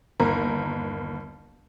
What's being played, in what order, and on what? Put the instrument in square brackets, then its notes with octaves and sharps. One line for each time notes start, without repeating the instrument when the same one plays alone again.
[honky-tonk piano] G1 D#2 A#4